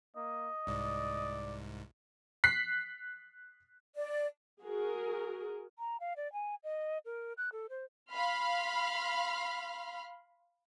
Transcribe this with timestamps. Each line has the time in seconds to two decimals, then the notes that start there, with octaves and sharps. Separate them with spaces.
0.16 A#3 D#5
0.67 C2 G#2 D5
2.44 F#6 B6 C7
3.96 D5
4.62 F#4 G#4 A#4
5.79 A#5
6.00 F5
6.17 D5
6.33 G#5
6.64 D#5
7.05 A#4
7.38 F#6
7.52 A4
7.70 C5
8.13 F5 B5 C6 F6